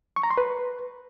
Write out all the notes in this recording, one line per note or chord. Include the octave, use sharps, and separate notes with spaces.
C#6
A#5
C6
B4